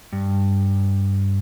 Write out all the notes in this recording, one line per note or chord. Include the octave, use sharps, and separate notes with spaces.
G2